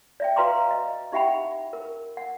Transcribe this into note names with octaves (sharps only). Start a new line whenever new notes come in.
D5 E5 G5
F#4 B4 F5 A#5 C6 D6
D#5
D#4 G4 E5 F#5 G5 B5
A#4
F#5